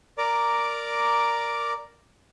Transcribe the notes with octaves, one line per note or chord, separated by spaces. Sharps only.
A#4 D5 A#5 D6